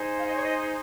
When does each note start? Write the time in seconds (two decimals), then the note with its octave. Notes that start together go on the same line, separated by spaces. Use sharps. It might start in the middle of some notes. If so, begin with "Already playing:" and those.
Already playing: D#4 G#4 C5
0.18 F5
0.26 D#5
0.34 C#5
0.43 D#5